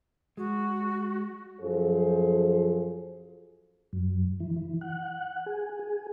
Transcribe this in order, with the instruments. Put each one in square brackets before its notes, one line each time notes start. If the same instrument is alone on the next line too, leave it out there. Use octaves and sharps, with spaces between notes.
[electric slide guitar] G#3 [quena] F#4
[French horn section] F#2 F3 F4 G#4 A4 C5
[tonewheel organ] F#2
E3
E3
F#5
G#4
G#4